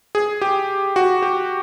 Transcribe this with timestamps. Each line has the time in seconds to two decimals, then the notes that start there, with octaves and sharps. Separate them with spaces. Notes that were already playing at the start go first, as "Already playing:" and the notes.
0.15 G#4
0.42 G4
0.96 F#4
1.22 G4